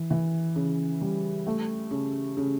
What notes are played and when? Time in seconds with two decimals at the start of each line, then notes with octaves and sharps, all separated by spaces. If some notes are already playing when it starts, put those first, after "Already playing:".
Already playing: E3
0.11 E3
0.56 C#3
1.01 G3
1.47 A3
1.91 C#3
2.37 C#3